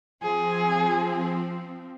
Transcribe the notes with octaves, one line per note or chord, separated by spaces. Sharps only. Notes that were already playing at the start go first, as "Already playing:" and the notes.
F3 C4 G#4